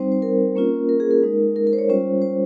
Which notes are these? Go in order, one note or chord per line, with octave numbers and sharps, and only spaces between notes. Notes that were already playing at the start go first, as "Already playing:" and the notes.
Already playing: G3 C4 D#4 C5
C5
A#4
A#3 C#4 F4
A#4
G#4
A#4
G#3 D#4
A#4
A#4
C5
C#5
G3 C#4 F4 C5
C5